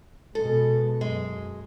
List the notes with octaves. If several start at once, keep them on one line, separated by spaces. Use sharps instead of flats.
B2 G#3 A4
F#2 G#3